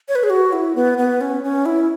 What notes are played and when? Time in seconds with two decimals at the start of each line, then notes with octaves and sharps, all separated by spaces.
0.08 C#5
0.15 B4
0.23 G#4
0.30 F#4
0.53 E4
0.75 B3
0.98 B3
1.21 C#4
1.43 C#4
1.66 E4